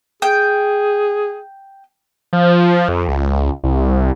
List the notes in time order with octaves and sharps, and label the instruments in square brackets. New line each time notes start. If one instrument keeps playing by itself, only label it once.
[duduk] G#4 [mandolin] G5
[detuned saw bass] F3
F2
C#2
C2